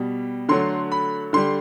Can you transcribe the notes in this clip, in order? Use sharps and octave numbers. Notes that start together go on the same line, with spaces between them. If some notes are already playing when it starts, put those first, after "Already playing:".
Already playing: B2 G3
D3 F#3 A3 C6
B5
D3 G3 C6